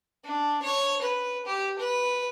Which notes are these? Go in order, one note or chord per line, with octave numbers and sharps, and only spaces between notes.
D4
C#5
B4
G4
B4